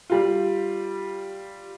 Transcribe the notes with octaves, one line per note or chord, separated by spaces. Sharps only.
G3 F4